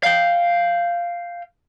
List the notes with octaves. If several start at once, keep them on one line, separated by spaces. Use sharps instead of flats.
F5 G5